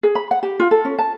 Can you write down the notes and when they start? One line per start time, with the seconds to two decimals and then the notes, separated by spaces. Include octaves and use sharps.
0.03 G#4
0.15 B5
0.31 F#5
0.43 G4
0.60 F4
0.71 A4
0.85 C#4
0.99 A5